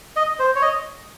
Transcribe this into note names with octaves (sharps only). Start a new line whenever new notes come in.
D#5
C5
C#5
D#5